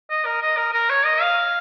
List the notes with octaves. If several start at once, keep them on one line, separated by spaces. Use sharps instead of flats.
D#5
A#4
D#5
A#4
A#4
C#5
D#5
F5